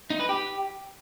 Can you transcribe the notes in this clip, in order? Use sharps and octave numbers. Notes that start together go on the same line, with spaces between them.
D#4
B4
G4